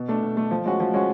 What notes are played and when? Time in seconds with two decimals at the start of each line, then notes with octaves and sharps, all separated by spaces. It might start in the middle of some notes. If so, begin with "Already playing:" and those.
Already playing: B2
0.09 A3 D4
0.23 B2
0.37 A3 D4
0.51 F3
0.65 G#3 C#4 F#4
0.80 F3
0.94 G#3 C#4 F#4